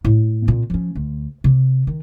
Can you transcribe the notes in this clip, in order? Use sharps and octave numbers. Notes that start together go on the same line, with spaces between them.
A2
A#2 C4
F3 C#4
D2
C3
D#3